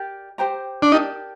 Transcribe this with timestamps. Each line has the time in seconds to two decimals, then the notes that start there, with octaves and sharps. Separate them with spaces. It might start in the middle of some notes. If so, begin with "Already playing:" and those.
Already playing: G4 A#4 D5 G5
0.38 G4 C5 G5 A#5
0.82 D4
0.92 D#4 G4 A#4 D5 A5